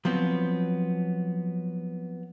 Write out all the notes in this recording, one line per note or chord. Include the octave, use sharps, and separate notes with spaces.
F3 F#3 B3 C4